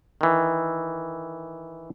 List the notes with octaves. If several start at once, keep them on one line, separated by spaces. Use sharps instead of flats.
D#3 E3